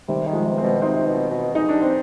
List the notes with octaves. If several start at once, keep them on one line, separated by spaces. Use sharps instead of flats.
C3 D#3 G3
D#3
F3 G#3
C3 B3
G#3 C4
B2
C3 C4 D#4
B2
B2
G#3 D#4
D4
G3
C4